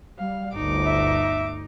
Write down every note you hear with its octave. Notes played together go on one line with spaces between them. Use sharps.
G3 F5
G1 D2 D#4 D6
E5